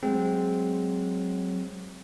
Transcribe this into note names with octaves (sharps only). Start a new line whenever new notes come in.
F#3 G#3 C4